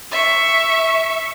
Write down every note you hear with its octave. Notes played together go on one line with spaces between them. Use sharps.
E5 C#6